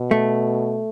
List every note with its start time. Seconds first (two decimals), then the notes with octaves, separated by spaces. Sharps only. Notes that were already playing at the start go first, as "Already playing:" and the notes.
Already playing: B2
0.11 A3